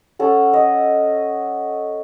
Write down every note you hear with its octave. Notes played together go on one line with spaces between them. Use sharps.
C#4 A4 F#5
D#5